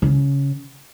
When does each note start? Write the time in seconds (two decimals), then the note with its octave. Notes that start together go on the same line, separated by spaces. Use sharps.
0.02 C#3